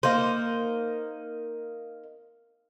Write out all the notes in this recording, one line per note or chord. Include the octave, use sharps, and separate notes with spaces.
A#3 D#4 C5